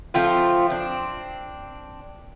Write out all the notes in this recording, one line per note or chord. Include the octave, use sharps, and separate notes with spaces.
F3 A3 C4 F4
C4 D4